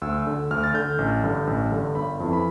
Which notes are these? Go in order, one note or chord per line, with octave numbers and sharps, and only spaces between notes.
D2 E6
D3
D2 F6
A6
D3 G6
A1
G2 D3
A1
G2 D3
G1 B5
F2 E3
B5